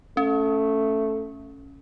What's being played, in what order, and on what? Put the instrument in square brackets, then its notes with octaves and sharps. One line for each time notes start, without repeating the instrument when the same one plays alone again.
[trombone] A3 [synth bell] C#4